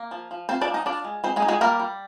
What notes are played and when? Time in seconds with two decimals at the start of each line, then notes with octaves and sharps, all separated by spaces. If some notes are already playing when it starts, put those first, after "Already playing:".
Already playing: A#3
0.11 F3
0.31 F3
0.49 C4 F4 C5
0.61 D4 D5
0.68 F3
0.74 D#4 D#5
0.86 D4 F4 D5
1.04 G#3
1.24 G#3 C4 C5
1.36 G#3 G#4
1.42 D#4
1.48 G#3 G#4
1.61 G3 A#3 A#4
1.80 G3